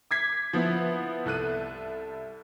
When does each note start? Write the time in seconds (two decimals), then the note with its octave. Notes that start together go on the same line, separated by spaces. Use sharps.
0.11 D6 G#6 B6
0.53 F3 B3 E4
1.25 C2 A4 F#6 D#7